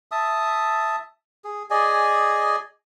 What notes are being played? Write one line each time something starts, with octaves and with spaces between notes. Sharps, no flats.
E5 A5 D#6
G#4
G#4 D5 D#5 G#5